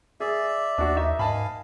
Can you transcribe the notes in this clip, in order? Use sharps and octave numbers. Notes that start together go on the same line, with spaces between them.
G#4 D5 E5
D#2 D4 F#4
D#4 E5
G#2 D#5 F5 G#5 A5 B5